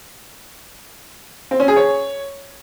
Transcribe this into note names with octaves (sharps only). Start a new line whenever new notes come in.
C4
C#4
G#4
C#5